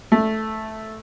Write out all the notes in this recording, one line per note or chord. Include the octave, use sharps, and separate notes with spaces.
A3